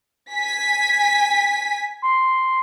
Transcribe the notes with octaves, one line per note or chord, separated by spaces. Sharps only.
G#5 B6
C6